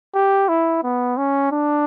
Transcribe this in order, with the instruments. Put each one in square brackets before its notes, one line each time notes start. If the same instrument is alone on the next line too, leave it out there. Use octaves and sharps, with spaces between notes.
[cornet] G4
E4
B3
C#4
D4